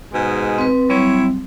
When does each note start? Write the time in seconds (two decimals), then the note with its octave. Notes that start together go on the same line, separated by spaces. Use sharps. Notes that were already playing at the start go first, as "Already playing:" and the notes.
0.13 G#2 B2 G#3
0.58 C4 B4
0.89 F#3 G3 C4 E4 C#5